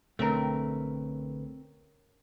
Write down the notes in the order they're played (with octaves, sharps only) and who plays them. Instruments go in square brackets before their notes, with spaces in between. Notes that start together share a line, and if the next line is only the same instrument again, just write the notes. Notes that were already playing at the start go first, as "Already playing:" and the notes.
[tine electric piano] B1 D3 B4 [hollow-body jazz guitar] A3 [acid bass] C4 [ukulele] C#4 A#4